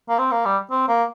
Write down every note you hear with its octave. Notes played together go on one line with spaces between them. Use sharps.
A#3
C4
A#3
G3
C4
A#3